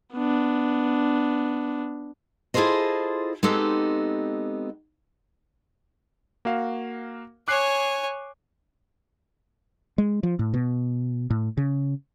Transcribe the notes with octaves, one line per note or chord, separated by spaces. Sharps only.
B3 D4
E4 F4 G#4 A4 C5 D#5
G#3 B3 C4 D#4 G4 A4
A#3 F#4 F5
C#5 G#5 D6 F#6 C7
G#3
F3
A2
B2
A2
C#3